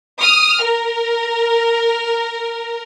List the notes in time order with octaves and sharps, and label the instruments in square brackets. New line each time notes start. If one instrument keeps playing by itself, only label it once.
[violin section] D#6 F6
A#4